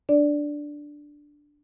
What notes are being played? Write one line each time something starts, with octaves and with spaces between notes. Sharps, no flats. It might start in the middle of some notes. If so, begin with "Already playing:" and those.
D4 D5